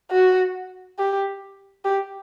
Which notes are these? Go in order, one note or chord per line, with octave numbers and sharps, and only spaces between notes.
F#4
G4
G4